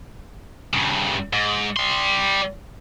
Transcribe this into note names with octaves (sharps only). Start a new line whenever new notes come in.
G2 C#3
G#2
G3 C6